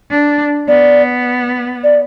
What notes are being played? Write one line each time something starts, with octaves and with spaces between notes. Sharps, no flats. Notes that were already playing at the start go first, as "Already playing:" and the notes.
D4
B3 D5
D5